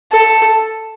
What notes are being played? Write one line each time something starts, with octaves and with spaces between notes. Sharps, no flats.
A4